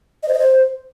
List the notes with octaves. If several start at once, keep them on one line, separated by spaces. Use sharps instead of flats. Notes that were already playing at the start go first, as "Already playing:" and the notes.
D#5
C5
D#5
C5